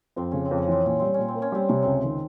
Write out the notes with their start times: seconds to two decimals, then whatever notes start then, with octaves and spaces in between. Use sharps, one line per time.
0.16 F2 C4
0.31 C#3 C#4
0.45 C4
0.51 F2
0.58 C#4
0.68 E3 C4
0.85 A#2 C#4
0.99 G3 C4
1.14 A#2 C#4
1.28 C4
1.35 A#3
1.42 C#4
1.52 G3 C4
1.69 C3 C#4
1.83 C#2 C4
2.04 D#3